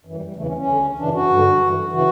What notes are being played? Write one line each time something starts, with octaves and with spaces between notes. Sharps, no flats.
F#2 E3
G3
G3
E2 C#3 E3 A3
C#4
C#4
D2 D3
F#2 C#3 E3 D4
F#4
G2 D3
G2 E3
C#3 E3 F#4